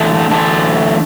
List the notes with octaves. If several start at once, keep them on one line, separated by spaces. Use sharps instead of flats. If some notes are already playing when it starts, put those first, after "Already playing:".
Already playing: E3 A3 D4
E3 A3 D4